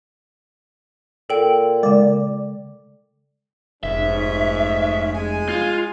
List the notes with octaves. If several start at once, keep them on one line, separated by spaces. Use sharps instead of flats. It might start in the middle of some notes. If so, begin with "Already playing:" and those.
A#2 A4 G5
C#3 G#3 D5
F1 G#2 C#4 E5
G#3 G#5
F4